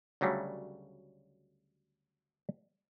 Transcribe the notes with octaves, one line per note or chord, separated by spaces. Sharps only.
D2 C#3 F#3 G3 A3